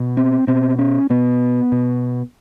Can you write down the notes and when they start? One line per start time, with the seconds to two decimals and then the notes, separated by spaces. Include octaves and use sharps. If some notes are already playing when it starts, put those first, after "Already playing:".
Already playing: B2
0.17 C4
0.47 B2 C4
0.79 C#4
1.10 B2 B3
1.72 B2